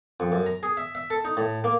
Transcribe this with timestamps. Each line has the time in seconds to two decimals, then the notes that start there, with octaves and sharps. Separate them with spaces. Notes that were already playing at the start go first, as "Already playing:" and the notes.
0.20 F2
0.32 F#2
0.46 A#5
0.63 G#4
0.77 E5
0.95 E5
1.10 A4
1.25 D#4
1.37 A2
1.64 A#3